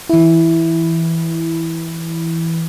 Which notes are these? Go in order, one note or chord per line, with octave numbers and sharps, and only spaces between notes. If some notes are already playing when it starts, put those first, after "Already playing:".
E3 E4